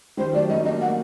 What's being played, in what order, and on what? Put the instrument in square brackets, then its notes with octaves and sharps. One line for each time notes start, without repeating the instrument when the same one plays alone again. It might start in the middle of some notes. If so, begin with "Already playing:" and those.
[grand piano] D#3 G3 [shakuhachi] C5
[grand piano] F#3 A3 [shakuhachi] D5
[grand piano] G3 A#3 [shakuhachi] D#5
[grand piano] A#3 D4 [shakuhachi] D#5
[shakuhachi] F#5
[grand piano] A#3